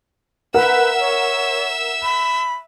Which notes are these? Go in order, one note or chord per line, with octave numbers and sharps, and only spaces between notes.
A#4 B4 E5 F#5 E6
C#5
B5